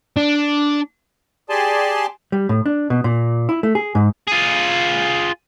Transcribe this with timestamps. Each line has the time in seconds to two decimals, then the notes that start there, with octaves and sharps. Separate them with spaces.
0.17 D4
1.50 G4 G#4 D5 G#5 A5 C6
2.32 G3
2.49 A2
2.66 D4
2.90 B2
3.04 A#2
3.49 E4
3.63 A3
3.75 G#4
3.95 G#2
4.27 F4 G#4